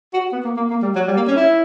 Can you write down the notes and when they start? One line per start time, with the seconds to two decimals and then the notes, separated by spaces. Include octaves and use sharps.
0.13 F#4
0.32 B3
0.45 A#3
0.57 A#3
0.70 A#3
0.82 G3
0.95 F#3
1.07 G3
1.17 A#3
1.27 C#4
1.36 E4